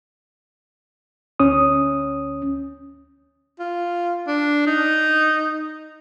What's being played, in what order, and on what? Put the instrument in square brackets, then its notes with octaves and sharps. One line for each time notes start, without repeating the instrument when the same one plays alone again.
[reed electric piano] D2 C#4 D#6
[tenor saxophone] F4
D4
D#4